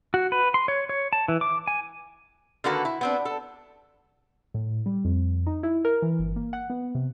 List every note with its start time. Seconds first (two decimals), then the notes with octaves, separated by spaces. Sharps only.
0.14 F#4
0.32 B4
0.54 C6
0.68 C#5
0.89 C#5
1.13 A5
1.28 E3
1.41 D6
1.68 G#5
2.64 D3 D#3 A#3 F#4 A4 B4
2.85 E4
3.01 B3 C4 D4
3.25 A4
4.54 A2
4.86 G3
5.05 F2
5.47 D#4
5.63 E4
5.85 A#4
6.02 E3
6.19 G1
6.36 A#3
6.53 F#5
6.70 B3
6.95 C3